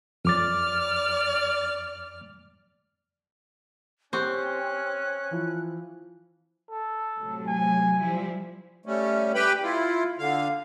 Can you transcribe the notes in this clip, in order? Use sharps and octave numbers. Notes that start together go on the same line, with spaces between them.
F2 D5 D6 F6 A6
C4 C#4 G4 C#6 F#6
E3 F3
A4
A2 C3 F#3
G#5
F3 G3 E4
G3 A3 C#4
G4 B4 G5 B5
E4 F4
D3 F5